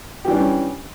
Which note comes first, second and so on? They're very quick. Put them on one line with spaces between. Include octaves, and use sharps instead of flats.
G4 E3 D4 G3 C#4